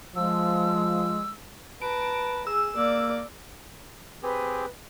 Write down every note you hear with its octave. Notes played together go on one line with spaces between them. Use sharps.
F3 G#3 E6
B4 A5 A#5 D7
G#4 E6
A#3 D5
C4 G4 G#4 B4